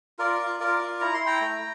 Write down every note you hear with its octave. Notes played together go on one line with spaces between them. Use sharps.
F4 A#4 D5
F4
F4 A#4 D5
F4
E4 A#5
C6
E4
G5 A#5
A3